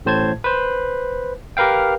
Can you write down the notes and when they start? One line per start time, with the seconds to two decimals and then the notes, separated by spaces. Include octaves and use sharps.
0.05 A1 A2 C5 A5 G#6
0.44 B4 C5
1.57 G4 A#4 B4 F5 G5